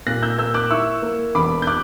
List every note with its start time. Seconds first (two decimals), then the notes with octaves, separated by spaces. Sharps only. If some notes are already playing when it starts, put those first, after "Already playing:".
0.07 A#2 F#6 A#6
0.22 E6 G6
0.38 A#3 E6 G6
0.54 D6 F#6
0.70 E4 C#6 E6
1.02 A#3
1.35 E1 B5 D6
1.62 G6
1.67 D6 F#6